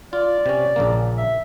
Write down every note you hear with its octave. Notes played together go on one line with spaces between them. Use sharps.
F4 D5
C3 C#4
A#1 C#3 A#3
E5